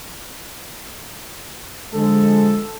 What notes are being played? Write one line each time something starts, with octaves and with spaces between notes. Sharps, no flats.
D3 F3 G#3 A4